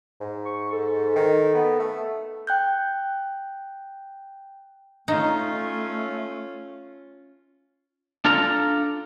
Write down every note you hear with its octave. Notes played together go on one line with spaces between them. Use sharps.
G#2
C#6
A4
D#3
B3
A3
G5 F#6 G6
A3 C#4 D#4 F4
D4 F4 A4 A#5